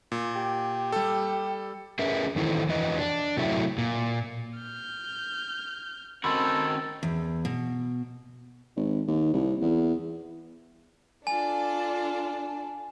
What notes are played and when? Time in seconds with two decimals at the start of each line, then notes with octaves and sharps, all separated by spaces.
0.12 A#2
0.36 G4
0.92 G3 A4
1.99 C#4 G#4 A#4 B4 E5
2.36 D#3 E3 E4 A4 C5
2.69 F2 E3 B4 D#5
2.97 D4
3.37 C3 F#3 A3 E4
3.78 A#2
4.58 F6 G6
6.24 D#3 C4 C#4 F#4 A4 B5 C6
7.03 E2
7.45 B2
8.76 G#1
9.08 D#2
9.33 C2
9.61 E2
11.27 D4 F4 A4 D5 G#5